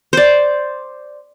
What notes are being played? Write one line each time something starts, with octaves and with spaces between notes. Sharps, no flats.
C5 D5